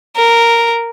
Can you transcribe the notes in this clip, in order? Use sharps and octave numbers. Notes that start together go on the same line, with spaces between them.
A#4